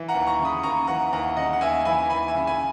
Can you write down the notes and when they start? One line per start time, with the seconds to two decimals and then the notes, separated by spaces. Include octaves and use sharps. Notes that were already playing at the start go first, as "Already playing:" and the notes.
Already playing: E3
0.09 F#5 A#5
0.14 D#2
0.27 A#5 C#6
0.39 C#3
0.45 B5 D#6
0.63 D#2 A#5 C#6
0.87 E3 F#5 A#5
1.13 D#2 F#5 A#5
1.37 C#3 D#5 F#5
1.53 F#5
1.61 D#2 E5 G#5
1.85 E3 G#5 B5
2.10 D#2 G#5 B5
2.28 E5 G#5
2.35 C#3
2.47 G#5 B5